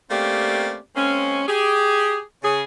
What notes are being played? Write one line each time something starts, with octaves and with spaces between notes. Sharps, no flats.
A3 A#3 C4 C#4 G4 D5
G#3 A#3 C4 C#4
G4 G#4
C#3 G#4